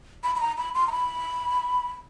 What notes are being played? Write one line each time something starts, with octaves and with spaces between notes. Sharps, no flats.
B5
B5
A#5
B5
C6
A#5
B5